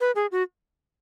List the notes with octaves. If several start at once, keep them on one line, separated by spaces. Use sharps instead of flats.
B4
G#4
F#4